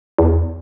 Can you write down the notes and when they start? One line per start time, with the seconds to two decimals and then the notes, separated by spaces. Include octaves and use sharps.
0.19 E2